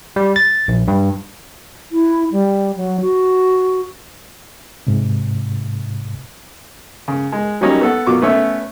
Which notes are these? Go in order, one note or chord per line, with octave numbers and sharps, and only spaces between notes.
G3
A6
A#1
G2
E4
G3
F#3
F#4
G#2 C3
C#3
G#3
F#3 G3 A#3 C#4 D#4
B3 A4 F#5
B2 F#3 F4 C#6 D6
A3 B3 C#4 E5